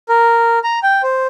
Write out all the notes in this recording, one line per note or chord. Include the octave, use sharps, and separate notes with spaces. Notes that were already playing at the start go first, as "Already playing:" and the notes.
A#4
A#5
G5
C5